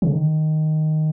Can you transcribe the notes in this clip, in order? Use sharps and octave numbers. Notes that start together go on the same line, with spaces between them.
C#3
D#3